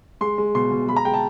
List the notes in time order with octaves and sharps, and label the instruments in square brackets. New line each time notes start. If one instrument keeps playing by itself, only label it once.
[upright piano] G#3 C6
G#3
B2 C6
B2
G#3 B5
A#5
G#3 G5
A5